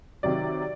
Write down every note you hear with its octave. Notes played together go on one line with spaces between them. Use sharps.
C3 D#3 F#3 D5